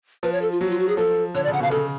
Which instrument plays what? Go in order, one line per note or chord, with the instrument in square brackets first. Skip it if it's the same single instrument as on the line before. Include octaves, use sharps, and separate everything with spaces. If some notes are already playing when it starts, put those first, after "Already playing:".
[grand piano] F3 [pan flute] B4
[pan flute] C#5
A4
F4
[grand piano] F#3 [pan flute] F#4
[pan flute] F4
F#4
G#4
[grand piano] F3 [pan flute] A4
[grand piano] D3 [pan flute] C#5
[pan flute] D5
[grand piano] C#3
[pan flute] F#5
[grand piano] B2 [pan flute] F5
[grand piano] C#3 [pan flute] A4